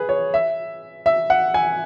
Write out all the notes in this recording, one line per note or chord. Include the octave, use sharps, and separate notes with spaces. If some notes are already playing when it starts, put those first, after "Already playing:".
Already playing: G#4 B4
C#5
E5
E5
F#5
G#5